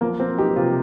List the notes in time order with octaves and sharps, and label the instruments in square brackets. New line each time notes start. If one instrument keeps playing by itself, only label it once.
[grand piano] F3 [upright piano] A#3
[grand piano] A#3 [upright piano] C4
[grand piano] D#4 [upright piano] G4
[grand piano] C3 [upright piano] F4